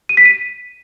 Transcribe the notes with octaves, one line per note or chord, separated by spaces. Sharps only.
D#7
B6
D#7